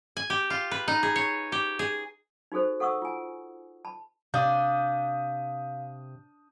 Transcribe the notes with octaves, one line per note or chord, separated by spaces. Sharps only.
G#5
G4
F4
B4
D#4
G#4
C#5
G4
G#4
D#4 F#4 G#4 A4 C5
A4 F#5 C#6 D#6 E6
F4 G#5
A5 B5
C3 D4 F5 D#6 G6